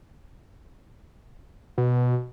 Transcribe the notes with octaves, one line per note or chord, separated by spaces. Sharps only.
B2